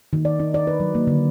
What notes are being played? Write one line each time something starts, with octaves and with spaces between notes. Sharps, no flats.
D#3
D5
D#4
D5
B4
F#3
A#3
D3